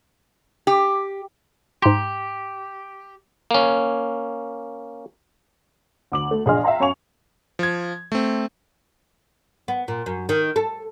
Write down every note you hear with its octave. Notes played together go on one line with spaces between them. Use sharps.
G4
G#2 G4 A#5 C6
A#3 C#4
D2 D6 F#7
A3
A#1 D4 G#4 D#5 C6 F6
E5 F5 G5 A#5 C6
F#2 C#5 F5 G#5 C#6 F7
F3 G#6
A3 C4
B3
A#2
F#2
D#3
A4